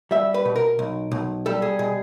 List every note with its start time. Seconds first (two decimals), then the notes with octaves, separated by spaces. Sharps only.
0.11 G3 E5
0.34 B4
0.45 B2
0.56 A#4
0.79 B1
1.12 B1
1.46 G3 A4
1.62 G#4
1.79 B2 G#4